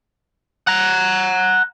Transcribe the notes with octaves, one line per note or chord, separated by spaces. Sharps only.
F#5 A#5